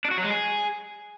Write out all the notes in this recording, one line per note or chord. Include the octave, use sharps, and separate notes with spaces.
D4
F#4
F#3
G#3
G#4